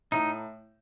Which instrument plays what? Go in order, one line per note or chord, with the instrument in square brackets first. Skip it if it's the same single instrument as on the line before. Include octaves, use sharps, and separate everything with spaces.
[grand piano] A2 [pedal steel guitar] D#4